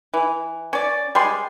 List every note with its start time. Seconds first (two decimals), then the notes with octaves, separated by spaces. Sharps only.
0.14 E3
0.73 C#4 D5
1.15 G3 G#3 C6